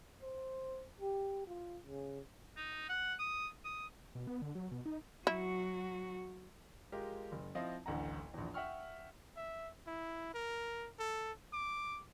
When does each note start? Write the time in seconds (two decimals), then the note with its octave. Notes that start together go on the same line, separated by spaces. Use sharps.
0.22 C5
1.00 G4
1.47 F4
1.83 C#3
2.57 D#4
2.89 F#5
3.19 D#6
3.65 D#6
4.15 B2
4.27 B3
4.42 D3
4.55 F#3
4.72 B2
4.86 D#4
5.27 F#3 E4 F#4
6.92 G#3 F4 G4 A#4
7.32 F#1
7.55 F3 C4 E4 D#5 F5
7.86 D1 A1 D2 F#5 A#5
8.34 A#1 E2
8.54 E5 F#5 G5 C#6 F6
9.37 E5
9.87 E4
10.34 A#4
10.99 A4
11.53 D6